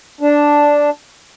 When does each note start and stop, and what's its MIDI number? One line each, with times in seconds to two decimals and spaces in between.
0.21 0.90 62